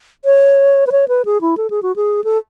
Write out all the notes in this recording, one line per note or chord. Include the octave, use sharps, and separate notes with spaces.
C#5
B4
C#5
B4
G#4
E4
A4
G#4
F#4
G#4
A4